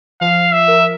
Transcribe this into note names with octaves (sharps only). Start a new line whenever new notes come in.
F3 F5
E5
A#4